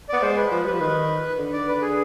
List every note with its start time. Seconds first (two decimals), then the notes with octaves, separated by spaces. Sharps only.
0.09 B3 D5
0.22 G#3 C5
0.36 B4
0.51 F3 B4
0.65 G3 B4
0.73 F3
0.80 D#3 B4
1.38 D3
1.53 D5
1.68 B4
1.82 G#4